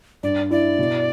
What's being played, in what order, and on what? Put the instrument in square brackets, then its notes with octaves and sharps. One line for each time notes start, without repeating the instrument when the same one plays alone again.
[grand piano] G2 [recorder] D5
[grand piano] E4 [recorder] D5
[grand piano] B2